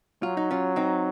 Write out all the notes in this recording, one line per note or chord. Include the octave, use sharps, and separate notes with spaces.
F#3 F4
D#4
C#4 F4
C4 D#4